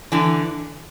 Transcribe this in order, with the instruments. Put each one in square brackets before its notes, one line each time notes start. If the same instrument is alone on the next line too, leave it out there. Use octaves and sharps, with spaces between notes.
[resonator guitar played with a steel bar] D3 E3